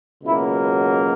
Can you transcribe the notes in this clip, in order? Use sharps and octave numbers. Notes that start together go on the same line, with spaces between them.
C#2 B2 F#3 A#3 E4